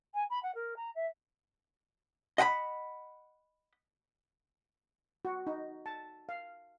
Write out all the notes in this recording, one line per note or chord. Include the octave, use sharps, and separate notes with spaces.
G#5
B5
F#5
A#4
A#5
E5
D#5 F#5 G5 B5
F#4
D#4
A5
F5